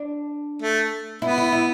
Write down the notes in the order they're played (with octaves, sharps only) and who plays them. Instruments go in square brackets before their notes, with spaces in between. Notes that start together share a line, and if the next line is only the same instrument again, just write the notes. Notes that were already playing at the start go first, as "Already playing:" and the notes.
Already playing: [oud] D4
[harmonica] A3
[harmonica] B3 [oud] E4
[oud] E4
E4